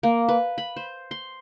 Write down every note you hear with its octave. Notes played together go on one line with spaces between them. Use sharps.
A#3
B4
B5
C5
C6